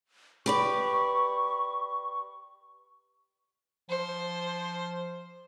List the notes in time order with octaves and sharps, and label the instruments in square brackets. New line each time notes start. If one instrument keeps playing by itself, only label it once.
[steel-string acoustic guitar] G4 B4 D5 [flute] C#6
[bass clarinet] F3 [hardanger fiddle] C5